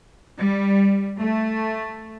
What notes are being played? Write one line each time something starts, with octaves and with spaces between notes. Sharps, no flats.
G3
A3